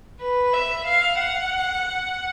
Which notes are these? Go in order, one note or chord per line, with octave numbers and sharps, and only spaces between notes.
B4
E5
F5
F#5